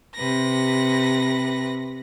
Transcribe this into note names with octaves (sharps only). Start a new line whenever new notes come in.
C3 B4 A#6